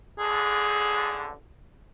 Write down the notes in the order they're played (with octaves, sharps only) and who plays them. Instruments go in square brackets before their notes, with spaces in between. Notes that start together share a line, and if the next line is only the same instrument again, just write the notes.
[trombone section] A1 D3 [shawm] G#4